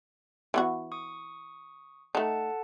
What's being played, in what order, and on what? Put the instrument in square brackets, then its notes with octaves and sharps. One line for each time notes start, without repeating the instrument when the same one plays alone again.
[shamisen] E3 B3 F#4
[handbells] C#6 D#6
[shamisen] A3 D#4 [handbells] A4 F#5 A5